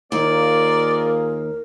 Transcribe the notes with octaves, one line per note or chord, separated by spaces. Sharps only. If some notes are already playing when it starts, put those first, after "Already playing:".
D#2 A#3 F4 G#4 A#4 D5